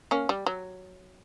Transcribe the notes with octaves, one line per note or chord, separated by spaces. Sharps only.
A#3 C#4
G3
F#3